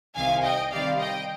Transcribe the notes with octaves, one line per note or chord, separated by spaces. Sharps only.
C2 C3 D#3 F5 G#5
D#5 G5
C3 D#3 G3 D5 F5
D#5 G5